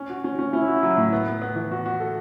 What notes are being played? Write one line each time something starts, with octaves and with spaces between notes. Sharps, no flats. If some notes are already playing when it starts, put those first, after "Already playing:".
Already playing: C#4
F#4
C#4
C#4
C#4 E4
F#4
F#3
A2
B3
B3
B3
E3
F#4
F#4
A4